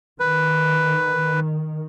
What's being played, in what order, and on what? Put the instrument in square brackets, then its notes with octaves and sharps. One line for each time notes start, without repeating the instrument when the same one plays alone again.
[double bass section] D#3 [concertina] B4